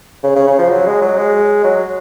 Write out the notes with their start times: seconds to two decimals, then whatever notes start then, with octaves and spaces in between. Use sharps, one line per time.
0.23 C#3
0.35 C#3
0.47 C#3
0.58 F3
0.70 F#3
0.87 G#3
1.02 F#3
1.17 G#3
1.64 F#3